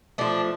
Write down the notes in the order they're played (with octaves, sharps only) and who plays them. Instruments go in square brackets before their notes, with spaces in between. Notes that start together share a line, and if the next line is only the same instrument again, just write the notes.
[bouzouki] F3 A3 D4